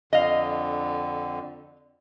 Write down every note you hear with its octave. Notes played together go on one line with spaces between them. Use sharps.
F2 D3 D#5 F5